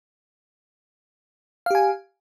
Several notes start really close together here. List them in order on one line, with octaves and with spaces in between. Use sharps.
F5 G4 G#5